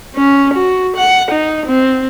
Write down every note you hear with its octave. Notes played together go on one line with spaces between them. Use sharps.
C#4
F#4
F#5
D#4
C4